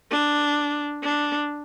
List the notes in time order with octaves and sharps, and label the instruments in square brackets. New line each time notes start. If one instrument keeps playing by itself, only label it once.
[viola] D4
D4